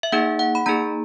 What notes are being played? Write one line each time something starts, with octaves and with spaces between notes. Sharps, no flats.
E5
A#3 D#4 G#4 F#5
F#5
B5
A#3 D#4 G#4 A#5